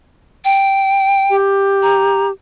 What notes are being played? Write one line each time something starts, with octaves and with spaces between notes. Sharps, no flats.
G5
G4
A#5